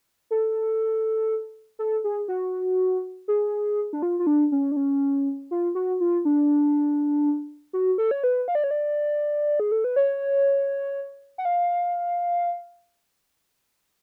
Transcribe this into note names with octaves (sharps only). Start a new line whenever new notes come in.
A4
A4
G#4
F#4
G#4
D4
F4
F4
D4
C#4
D4
C#4
F4
F#4
F4
D4
F#4
A4
C#5
B4
F5
D5
C#5
D5
G#4
A4
B4
C#5
F#5
F5